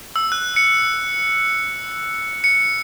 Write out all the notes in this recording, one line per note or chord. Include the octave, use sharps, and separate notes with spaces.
E6
F#6
C#7
C#7